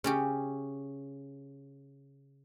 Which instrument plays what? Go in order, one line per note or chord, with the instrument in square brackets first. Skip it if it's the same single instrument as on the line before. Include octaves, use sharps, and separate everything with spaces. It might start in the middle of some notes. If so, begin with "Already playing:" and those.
[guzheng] C#3 C#4 G4